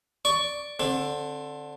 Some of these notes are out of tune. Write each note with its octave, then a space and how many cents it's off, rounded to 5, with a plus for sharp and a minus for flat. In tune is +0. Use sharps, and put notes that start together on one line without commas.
D5 +0 C#6 +15
D3 +0 C4 +25